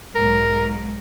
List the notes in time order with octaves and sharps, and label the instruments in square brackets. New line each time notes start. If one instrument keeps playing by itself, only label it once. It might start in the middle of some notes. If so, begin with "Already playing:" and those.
[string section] B1 G#2 [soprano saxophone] A#4